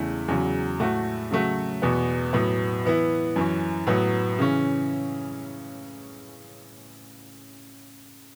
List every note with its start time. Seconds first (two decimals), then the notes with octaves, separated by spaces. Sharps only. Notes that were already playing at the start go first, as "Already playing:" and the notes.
Already playing: E2 C#3 A3 E4
0.28 E2 C#3 F#3
0.79 A2 A3 F#4
1.31 C#3 F#3 A3 F#4
1.82 E2 B2 B3
2.33 A2 F#3 B3
2.85 E3 B3 E4
3.36 F#2 E3 C#4
3.87 A2 F#3 B3
4.39 C#3 E3 C#4